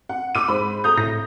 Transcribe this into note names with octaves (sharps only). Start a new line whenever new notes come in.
F#5
D6 E6 D#7
G#2 C5 B5
A4 A#5 D#6 G6
A2 A3 A#6